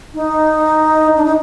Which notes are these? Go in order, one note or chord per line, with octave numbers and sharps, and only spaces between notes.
D#4
D4
D#4